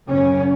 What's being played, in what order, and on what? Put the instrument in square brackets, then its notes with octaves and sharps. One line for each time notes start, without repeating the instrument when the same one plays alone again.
[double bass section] F#2 C#3 C#4